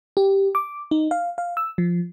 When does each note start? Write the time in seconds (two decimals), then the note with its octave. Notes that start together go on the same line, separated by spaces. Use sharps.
0.17 G4
0.55 D6
0.91 D#4
1.11 F5
1.38 F5
1.57 E6
1.78 F3